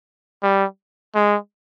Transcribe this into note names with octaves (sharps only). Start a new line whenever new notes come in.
G3
G#3